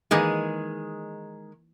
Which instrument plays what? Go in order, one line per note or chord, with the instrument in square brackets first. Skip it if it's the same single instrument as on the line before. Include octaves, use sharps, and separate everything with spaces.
[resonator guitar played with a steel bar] D#3 G#3 G#4 [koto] E3 A#3 D#4